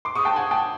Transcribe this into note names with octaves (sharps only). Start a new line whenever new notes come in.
C6 D6
C#6 D#6
G5 A5
F#5 G#5
G5 A5